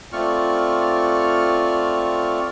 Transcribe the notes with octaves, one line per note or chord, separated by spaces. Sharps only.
A3 C4 F4 D5 C#6 F6